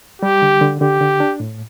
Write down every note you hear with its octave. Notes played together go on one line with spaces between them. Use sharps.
G3 G4
D3
D3
D3 G4
D3
D4
A2